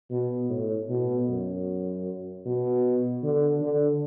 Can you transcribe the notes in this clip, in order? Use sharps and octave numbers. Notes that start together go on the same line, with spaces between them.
B2
A2
B2
F#2
B2
D3
D3